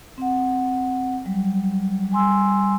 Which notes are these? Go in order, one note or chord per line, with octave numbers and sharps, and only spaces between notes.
C4 F#5
F#3 G3
G3 G#5 C6 E6